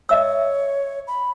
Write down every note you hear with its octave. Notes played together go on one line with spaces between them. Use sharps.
C#5 D#5 E5 E6
B5